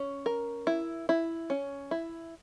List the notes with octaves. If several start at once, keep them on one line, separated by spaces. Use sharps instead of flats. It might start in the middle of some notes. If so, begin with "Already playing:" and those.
Already playing: C#4
A#4
E4
E4
C#4
E4